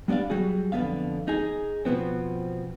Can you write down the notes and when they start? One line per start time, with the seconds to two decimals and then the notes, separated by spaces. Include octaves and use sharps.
0.08 G3 B3 D4 D5 F5
0.30 F#3 G3 F#4 G#4
0.72 F2 D3 B3 E5 F5
1.28 D#4 G#4
1.85 B2 F3 B3 C4